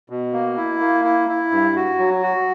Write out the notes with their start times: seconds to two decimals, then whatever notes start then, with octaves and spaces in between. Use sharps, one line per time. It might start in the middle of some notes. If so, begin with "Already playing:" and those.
0.10 B2
0.33 A#3
0.57 E4
0.80 A#3
1.04 E4
1.29 E4
1.52 G2
1.76 F#4
1.99 F#3
2.23 F#4